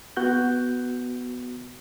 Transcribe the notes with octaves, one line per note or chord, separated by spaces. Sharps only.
B3 F#4 F#6 G6